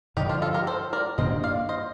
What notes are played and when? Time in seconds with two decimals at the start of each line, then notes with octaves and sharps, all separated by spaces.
0.17 G2 D3 F3 D#4 G4
0.29 D4 F4
0.42 F4 A4
0.54 G4 A#4
0.67 A4 C5
0.93 A#4 D5
1.18 G2 D#3 A#3 D4 C5 D#5
1.43 D5 F5
1.69 C5 D#5